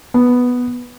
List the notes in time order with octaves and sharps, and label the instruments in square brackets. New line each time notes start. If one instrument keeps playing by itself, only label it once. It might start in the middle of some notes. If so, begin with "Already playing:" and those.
[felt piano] B3